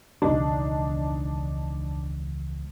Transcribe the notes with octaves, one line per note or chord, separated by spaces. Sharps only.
E1 C#2 D#3 D4 D#4